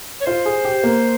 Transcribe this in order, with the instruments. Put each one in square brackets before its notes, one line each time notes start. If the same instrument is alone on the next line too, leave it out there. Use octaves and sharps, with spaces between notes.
[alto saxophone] C#5
[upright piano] F4 [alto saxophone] C5
[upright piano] G#4
G4
A#3